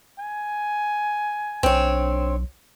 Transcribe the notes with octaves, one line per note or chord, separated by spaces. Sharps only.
G#5
B1 C4 D4 C#5